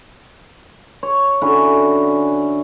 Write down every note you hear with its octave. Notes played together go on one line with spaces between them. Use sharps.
C#5
D3 C#4 E4 F#4